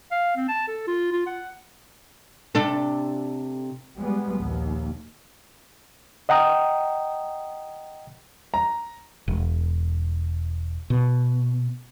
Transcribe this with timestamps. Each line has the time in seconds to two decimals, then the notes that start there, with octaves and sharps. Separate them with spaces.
0.11 F5
0.36 C4
0.48 A5
0.68 A4
0.87 F4
1.12 F4
1.26 F#5
2.55 C3 D4 A4
3.98 G3 G#3 B3
4.38 A#1 D#2
6.29 D#5 F#5 G5 A#5 D#6
8.54 A#5
9.28 E1
10.90 B2